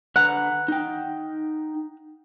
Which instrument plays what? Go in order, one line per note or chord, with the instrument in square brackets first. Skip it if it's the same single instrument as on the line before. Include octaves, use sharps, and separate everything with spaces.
[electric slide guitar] D3 B4 A#5 [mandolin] F#5
[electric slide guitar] D#4 G5